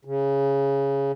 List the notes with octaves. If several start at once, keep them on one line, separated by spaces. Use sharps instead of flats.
C#3